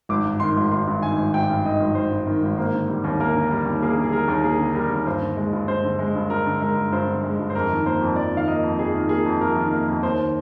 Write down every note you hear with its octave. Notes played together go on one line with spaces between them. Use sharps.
G#1 D6
G2
D#3 C6
G#1
G#1 C6
G2
D#3 G#5
G#1
G#1 G5
G2
D#3 D#5
G#1
G#1 C5
G2
D#3
G#1
A#3 C5
D3
G3
D#2
A#3 A#4
D3
G3
D#2
A#3 G#4
D3
G#4
G3 A#4
D#2
A#3 G#4
D3
G3 A#4
D#2
G2 C5
D3
G#3
G2
G2 C5
D3
G#3
G2
G2 A#4
D3
G#3 A#4
G2
G2 C5
D3
G#3
G2
C5
F2 A#4
D#3
A#3 C5
F2
F2 D5
D#3 F5
A#3 D#5
F2
F2 G#4
D#3
A#3 G#4
F2
F2 A#4
D#3
A#3
F2
D#2 C5
D#3